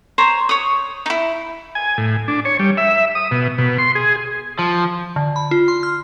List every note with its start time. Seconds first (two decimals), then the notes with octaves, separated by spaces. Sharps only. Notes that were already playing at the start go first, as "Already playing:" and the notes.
0.18 C5 C#5 A#5
0.49 C#5 D#6
1.06 D#4 E4
1.75 G#5
1.98 A2
2.28 D4
2.45 C#5
2.59 G3
2.77 E5
3.15 D#6
3.31 B2
3.58 B2
3.78 C6
3.95 G#4
4.59 F3
5.16 D3
5.36 B5
5.51 F4
5.68 C6
5.83 F6